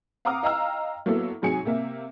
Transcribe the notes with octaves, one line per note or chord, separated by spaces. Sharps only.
F5 F#5 A#5 D6 D#6 F6
D#5 F5 G5 A#5 E6 F6
F#3 A#3 B3 E4 A4
G#2 C3 F#3 G#4 G#5 C#7
C3 A#3 E5